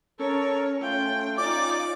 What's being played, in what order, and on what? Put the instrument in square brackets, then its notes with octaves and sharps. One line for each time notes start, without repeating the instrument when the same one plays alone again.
[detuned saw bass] C#4 [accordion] A4 A#4 [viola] C#5
[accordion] A3 F4 [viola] G5
[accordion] C#4 [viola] D#4 D5 [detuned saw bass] F4 [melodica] D6